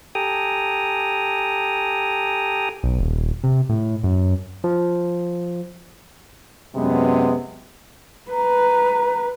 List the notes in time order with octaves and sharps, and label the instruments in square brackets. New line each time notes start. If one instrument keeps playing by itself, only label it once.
[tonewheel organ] G4 A4 G5 G#5 A#5 D#6
[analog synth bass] B1
D#1
C3
A2
F#2
[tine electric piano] F3
[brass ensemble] F#2 C3 G#3 B3
[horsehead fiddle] B4 [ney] A#5